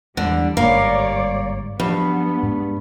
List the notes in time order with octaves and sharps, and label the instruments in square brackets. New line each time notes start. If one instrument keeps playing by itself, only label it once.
[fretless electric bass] E2 [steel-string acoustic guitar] D3 [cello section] G3
[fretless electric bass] G1 G#2 [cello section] G3 C#5 D5 [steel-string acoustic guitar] A#3
[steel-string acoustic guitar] G2 [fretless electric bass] F3 F#3 A#3 [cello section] B3
[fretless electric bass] G#2 G#3